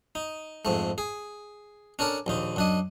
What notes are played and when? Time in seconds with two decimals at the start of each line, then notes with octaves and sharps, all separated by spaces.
0.15 D#4
0.65 F2 G#2 A3
0.98 G#4
1.99 C#4 D4 A4 A#4
2.26 A#1 D#2 D#4
2.56 F#2 D4 D#5